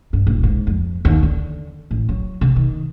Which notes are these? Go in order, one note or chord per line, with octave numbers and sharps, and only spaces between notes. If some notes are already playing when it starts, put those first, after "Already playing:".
G2
D#1
G#2
F2
D#2
D3
A1
F#3
C3
D#3